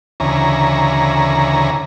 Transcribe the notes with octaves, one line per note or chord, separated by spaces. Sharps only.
D2 C#3 E3 A#5